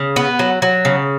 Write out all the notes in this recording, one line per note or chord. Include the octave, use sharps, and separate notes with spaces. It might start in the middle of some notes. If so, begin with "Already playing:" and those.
Already playing: C#3
B3
F#3
F#3
C#3